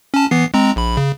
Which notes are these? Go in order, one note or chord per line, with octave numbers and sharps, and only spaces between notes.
C#4 A5
E3 B3 C7
G#3 C4 A#5
A#1 B5
C#3